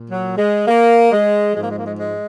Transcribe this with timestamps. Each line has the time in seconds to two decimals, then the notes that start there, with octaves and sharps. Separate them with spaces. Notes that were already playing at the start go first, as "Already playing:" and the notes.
Already playing: A#2
0.10 F#3
0.38 G#3
0.68 A#3
1.12 G#3
1.55 G#2 F3 G#3
1.63 A#3
1.71 G#3
1.79 A#3
1.87 G#3
1.99 G#3